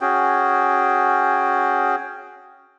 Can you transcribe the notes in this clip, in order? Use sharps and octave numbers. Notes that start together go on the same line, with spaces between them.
C#4 F#4 G#4 G5